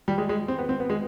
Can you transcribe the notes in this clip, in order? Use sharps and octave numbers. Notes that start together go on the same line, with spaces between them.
G3
G#3
G#3
C4
B3
C4
B3
G#3